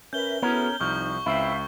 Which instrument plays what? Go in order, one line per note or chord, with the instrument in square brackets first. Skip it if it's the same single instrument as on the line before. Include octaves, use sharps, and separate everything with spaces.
[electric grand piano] C#4 [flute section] A#4 B4 E5 [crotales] G6 G7
[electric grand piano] B3 [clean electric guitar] C#4 A#4 [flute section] E4 F#4 A4
[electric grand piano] C2 [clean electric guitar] F3 [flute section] D#4 [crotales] C#6
[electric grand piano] C#2 [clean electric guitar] C4 E4 [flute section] E5 F5